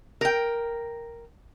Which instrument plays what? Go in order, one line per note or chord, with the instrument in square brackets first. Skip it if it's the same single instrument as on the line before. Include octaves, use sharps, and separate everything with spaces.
[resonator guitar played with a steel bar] A#4 G5